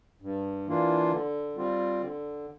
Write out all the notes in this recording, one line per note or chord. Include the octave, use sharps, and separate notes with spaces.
G2
E3 A#3 D4 F4
D3
G3 C4 F4
D3